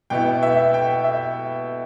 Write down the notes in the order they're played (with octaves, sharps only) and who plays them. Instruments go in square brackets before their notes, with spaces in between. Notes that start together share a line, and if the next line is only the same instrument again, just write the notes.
[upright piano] B2 B3 E4 G5
E5
G5
E5